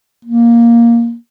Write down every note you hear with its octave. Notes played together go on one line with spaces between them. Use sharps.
A#3